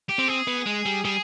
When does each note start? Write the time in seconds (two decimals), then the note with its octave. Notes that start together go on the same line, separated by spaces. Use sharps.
0.09 G4
0.19 C4
0.28 G#4
0.47 B3
0.66 G#3
0.86 G3
1.05 G3 G#4